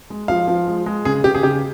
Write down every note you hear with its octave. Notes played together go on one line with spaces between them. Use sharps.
G#3
F3 F5
F3
G#3
G#3
C#3 G#4
C#3 G4
G#4
C#3 G4